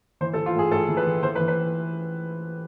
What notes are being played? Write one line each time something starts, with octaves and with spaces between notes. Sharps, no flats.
E3 C5
A4
E3
F4
A2 G#4
A2 A4
E3
B4
E3
E3 C5
B4
E3
B4